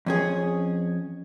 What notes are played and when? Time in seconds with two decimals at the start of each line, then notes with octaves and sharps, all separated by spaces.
0.06 F2 C#4 G#4